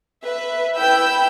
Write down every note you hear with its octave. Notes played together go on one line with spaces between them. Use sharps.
B4 E5
E4 B4 G5 B5 E6 G6